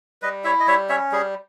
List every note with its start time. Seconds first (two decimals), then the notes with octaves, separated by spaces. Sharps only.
0.22 G3 B4 D#5
0.44 E4 C#5 E5
0.60 D#5
0.67 G3 C#5 E5
0.89 C#4 C#5 E5
1.12 G3 G#4